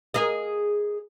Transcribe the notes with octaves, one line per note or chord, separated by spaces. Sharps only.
G#4 A#4 D#5